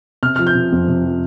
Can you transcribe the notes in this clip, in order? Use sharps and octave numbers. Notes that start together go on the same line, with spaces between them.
C3 F6
F3 F6
G6
C3
F2
C3
F3